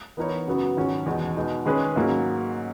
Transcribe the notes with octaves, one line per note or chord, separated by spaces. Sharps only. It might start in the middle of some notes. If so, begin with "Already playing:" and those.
E3 B3 D#4 A#4 C#5
F#2 C#3 F#3 B3 F#4
G#2 D#3 F#3 C#4 F#4
E2 B2 G#3 D#4
B2 G#3 D#4
D#3 G#3 C#4 G#4 B4
G#2 F#3 A#3 C#4